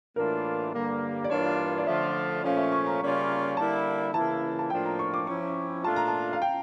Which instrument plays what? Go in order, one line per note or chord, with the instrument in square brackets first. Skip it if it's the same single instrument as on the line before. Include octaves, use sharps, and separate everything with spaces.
[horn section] A2 E3 A#3 D4 F4 [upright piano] A#4
[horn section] G2 D3 G3 A#3
[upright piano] D5
[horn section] G2 E3 A#3 D4 F4 [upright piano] C#5
[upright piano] D5
[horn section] D3 F3 A3 D4 F4 [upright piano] E5
[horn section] A#2 F3 A3 C#4 [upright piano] F5
[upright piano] E5
C#6
A#5
[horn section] C#3 G3 A#3 C#4 F4
[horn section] D3 G3 A#3 E4 [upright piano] A5
[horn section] C#3 E3 A#3 E4 [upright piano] A5
[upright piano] A5
[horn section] A2 F3 A#3 D4 F4 [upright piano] G5
[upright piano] A#5
C#6
D6
[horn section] F3 C#4 E4 [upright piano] C#6
[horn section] A#2 A3 D4 F4 [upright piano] A5
[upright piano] A#5
A5
F5
G5